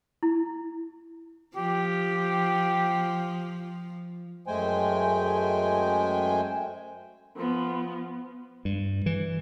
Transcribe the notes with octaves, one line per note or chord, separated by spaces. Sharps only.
E4
F3 G4
F#2 G#3 A3 C5 G5 G#5
F3 B3
G2
E3